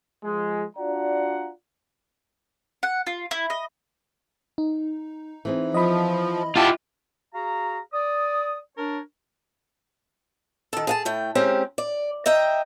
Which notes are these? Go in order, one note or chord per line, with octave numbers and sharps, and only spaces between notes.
F3 G#3
D4 F4 F#4 D5 F#5 A#5
F#5
F4
E4
D#5
D#4
E3 C4 G#4
F3 D#5 B5
E4 F4 G4 A5
F#4 G#4 F5 A#5
D5 D#6
D4 A#4 C#5
D#3 A4
G#4 F5 A5
A2 A3 G5
G#3 C4 C#4 G4 A#4
D5
D#5 E5 G5 A#5